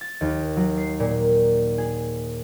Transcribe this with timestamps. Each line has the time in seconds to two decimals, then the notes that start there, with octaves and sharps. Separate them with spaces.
0.01 A6
0.21 D#2
0.56 F#3
0.78 C7
1.00 A#2
1.78 G#4